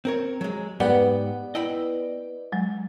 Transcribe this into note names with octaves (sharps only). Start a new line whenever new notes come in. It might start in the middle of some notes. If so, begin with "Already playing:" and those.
C4 A#4 C#5
F#3 G#3
G#2 B3 G4 B4 D5 F#5 G5
E4 D#5 G5 B5
F#3 G#3